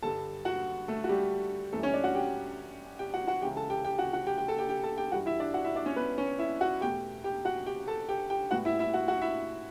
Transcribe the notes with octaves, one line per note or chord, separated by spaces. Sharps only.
G2 D3 G3 A4 A5
F#4 F#5
A3 A4
F#4
G3 G4
F#2 E3 G3 A3 A4
C#4 C#5
D4 D5
F#4 F#5
G4 G5
G4 G5
F#4 F#5
F#4 F#5
C#2 C#3 E3 G4 G5
A4 A5
G4 G5
G4 G5
F#4 F#5
F#4 F#5
G4 G5
G4 G5
A4 A5
G4 G5
G4 G5
A4 A5
G4 G5
G2 E3 G3 F#4 F#5
E4 E5
D4 D5
F#4 F#5
E4 E5
D4 D5
C#4 C#5
B3 B4
C#4 C#5
E4 E5
F#4 F#5
E2 B2 A3 G4 G5
G4 G5
F#4 F#5
G4 G5
A4 A5
G4 G5
G4 G5
A2 G3 B3 F#4 F#5
E4 E5
E4 E5
F#4 F#5
F#4 F#5
E4 E5